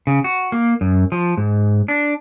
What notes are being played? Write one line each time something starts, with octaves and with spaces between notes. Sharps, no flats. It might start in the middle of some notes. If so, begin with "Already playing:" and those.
C#3
F#4
A#3
F#2
F3
G#2
D4